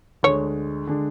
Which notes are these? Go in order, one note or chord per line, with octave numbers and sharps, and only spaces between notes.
D2 D3 G#3 C#5
D3 G#3 D4